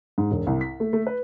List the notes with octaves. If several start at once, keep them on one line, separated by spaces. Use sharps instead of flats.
G#2
E1
C2
B6
A3
A3
B4